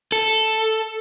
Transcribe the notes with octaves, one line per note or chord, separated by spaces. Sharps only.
A4